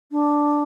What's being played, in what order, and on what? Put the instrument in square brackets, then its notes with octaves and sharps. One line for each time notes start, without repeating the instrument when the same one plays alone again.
[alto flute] D4